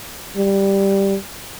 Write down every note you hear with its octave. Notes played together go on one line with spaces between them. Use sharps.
G3